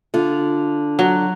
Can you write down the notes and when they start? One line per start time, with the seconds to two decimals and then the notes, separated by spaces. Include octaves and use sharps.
0.14 D3 F4
0.99 F#3